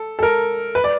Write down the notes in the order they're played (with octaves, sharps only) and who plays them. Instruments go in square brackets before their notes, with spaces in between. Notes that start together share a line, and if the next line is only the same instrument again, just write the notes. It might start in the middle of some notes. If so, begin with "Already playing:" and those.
Already playing: [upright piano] A4
A4
A#4
B4
D5